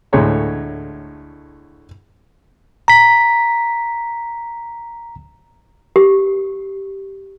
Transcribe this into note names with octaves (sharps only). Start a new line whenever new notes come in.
D2 A2 G#3 C#5 A#5
A#5 B6
G4